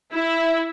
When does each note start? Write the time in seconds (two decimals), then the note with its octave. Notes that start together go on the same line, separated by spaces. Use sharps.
0.13 E4